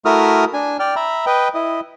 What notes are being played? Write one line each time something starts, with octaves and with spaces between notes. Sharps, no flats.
A3 E4 F#4 A#4 D#6 F6
D4 G#5
D5 G5 F6
E5 A#5 B5
B4 D#5 G5
E4 D#5